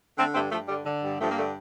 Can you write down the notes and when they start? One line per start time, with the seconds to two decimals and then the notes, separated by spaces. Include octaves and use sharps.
0.17 D3 A3 C4
0.35 G2 A3 C4
0.51 G2 F3 A3
0.68 D3 G3
0.86 D3
1.03 G2
1.20 G2 F3 A3
1.31 A#3
1.37 D3 A3